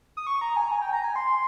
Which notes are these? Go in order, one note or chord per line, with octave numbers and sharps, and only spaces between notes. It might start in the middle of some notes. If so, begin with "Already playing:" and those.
D#6
C#6
A#5
G#5
A#5
G#5
G5
A#5
G#5
C6